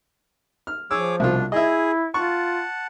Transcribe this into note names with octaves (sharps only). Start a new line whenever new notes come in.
F6
F3 G#4 C#5 D6 E6
C2 B2 D4 F4
E4 G#4 D#5 E5
F4 F#5 A5 C#6